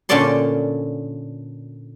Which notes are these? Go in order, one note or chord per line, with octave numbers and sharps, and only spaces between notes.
A#2 D3 C#4 A4 D5 C6